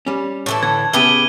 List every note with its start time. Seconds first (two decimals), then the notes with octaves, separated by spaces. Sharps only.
0.06 G3 C#4
0.46 A2 E3 A4
0.63 D3 G#6
0.93 C#3 B3 E4 G4 G#4 D#7 G7